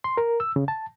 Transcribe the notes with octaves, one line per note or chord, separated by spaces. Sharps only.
C6
A#4
E6
C#3
A5